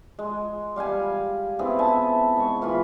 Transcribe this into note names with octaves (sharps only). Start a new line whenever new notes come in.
G#3
G3 F5 G5 G#5
B3 C4 E4 G#4
E5 G#5 A5
G#2 C#6
E3 F4 B5